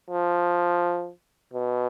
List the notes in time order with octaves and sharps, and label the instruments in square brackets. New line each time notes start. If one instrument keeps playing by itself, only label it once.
[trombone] F3
B2